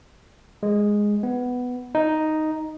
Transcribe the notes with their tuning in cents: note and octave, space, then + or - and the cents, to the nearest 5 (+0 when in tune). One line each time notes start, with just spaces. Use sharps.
G#3 -5
B3 +5
D#4 +0